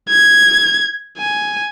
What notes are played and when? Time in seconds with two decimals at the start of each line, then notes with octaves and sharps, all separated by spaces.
0.10 G#6
1.18 G#5